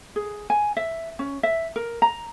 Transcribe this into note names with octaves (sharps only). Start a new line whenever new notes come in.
G#4
G#5
E5
C#4
E5
A#4
A#5